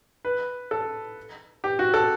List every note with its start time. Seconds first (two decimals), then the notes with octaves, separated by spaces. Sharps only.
0.25 B4
0.71 A4
1.64 G4
1.79 F#4
1.94 A4